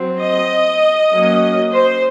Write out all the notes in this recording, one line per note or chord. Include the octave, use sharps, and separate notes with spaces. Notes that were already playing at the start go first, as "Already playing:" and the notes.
Already playing: F#3 C4
D#5
F#3 A#3 C#4
C5